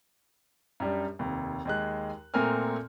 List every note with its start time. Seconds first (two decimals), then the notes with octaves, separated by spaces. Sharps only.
0.80 F#2 G3 D4
1.19 F1 D#2
1.65 D#2 G#3 F#6
2.34 A#2 A3 C4 A#4 G#5 F6